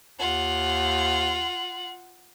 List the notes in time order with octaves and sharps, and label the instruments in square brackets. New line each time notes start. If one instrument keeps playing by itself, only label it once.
[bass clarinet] D#2 [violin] F4 F#5 [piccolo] F#7